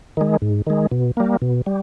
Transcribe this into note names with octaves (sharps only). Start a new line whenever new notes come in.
D#3 G#3
G#2
D#3 G#3
B2
G3 A#3
B2
G3